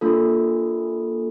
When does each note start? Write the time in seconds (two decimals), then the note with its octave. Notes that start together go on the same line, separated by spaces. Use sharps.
0.01 A#3 D4 F4 A4